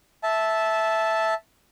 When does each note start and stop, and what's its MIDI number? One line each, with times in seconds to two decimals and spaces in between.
0.23 1.34 76
0.23 1.34 81